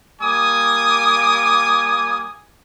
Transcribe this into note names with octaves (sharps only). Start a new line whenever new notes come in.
G3 A#3 G#5 D6 D#6